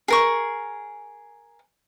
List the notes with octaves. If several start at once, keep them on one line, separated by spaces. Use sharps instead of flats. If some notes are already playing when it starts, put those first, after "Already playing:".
G#4 A#4 C#6